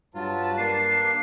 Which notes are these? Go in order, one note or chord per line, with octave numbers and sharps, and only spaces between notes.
G2 F#3 F4 B4 A5
A#3 D4 C7